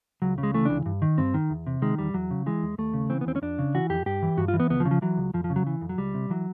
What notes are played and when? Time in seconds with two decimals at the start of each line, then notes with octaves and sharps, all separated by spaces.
0.22 C#2 F#3
0.38 C#3
0.43 G#3
0.54 E3 A3
0.65 C#2 D4
0.86 G2
1.02 D#3
1.18 G2 C4
1.34 D#3
1.50 E2
1.67 C3
1.82 D#3 G#3
1.98 E2 G3
2.14 E2 F#3
2.31 C#3
2.46 E3 G#3
2.63 E2
2.78 D#2 A3
2.94 C#3
3.10 E3 C4
3.21 B3
3.26 D#2 C4
3.36 C#4
3.42 F2 D4
3.59 C#3
3.75 E3 F#4
3.90 F2 G4
4.06 G2 G4
4.23 E3
4.37 G2 F#4
4.48 F4
4.54 E3
4.60 B3
4.70 C#2 B3
4.80 F3
4.85 C#3
4.91 F3
5.02 E3 F#3
5.18 C#2
5.34 F2 F3
5.44 F3
5.50 C#3
5.56 F#3
5.67 E3
5.81 F2
5.89 F#3
5.98 C#2 G3
6.14 C3
6.30 E3 F#3